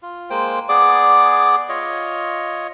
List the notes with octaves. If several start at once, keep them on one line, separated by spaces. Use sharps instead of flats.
F4
G#3 A#3 C5 G5
B3 G#4 D5 D6
F4 C#5 D#5